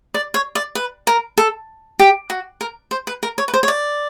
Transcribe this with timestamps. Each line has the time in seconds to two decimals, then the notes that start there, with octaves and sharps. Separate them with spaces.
0.14 D5
0.34 C#5
0.55 D5
0.75 B4
1.07 A#4
1.38 A4
1.99 G4
2.30 F#4
2.61 A#4
2.91 C5
3.07 B4
3.23 A#4
3.38 C#5
3.48 B4
3.54 C5
3.63 C#5
3.68 D5